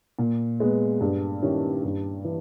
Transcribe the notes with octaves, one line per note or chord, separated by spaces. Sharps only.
A#2
G#3 B3
G2
D#3 G3 C#4 E4
G2
E3